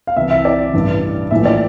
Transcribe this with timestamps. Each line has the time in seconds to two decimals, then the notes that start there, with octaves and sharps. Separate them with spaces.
0.07 F5
0.16 C2 C3 E3 E5
0.31 E5
0.45 D5
0.73 A1 G2 E3
1.31 A#1 A2 E3 E5
1.45 D5